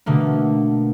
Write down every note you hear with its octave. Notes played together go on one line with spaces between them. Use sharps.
B2 D3 A3 A#3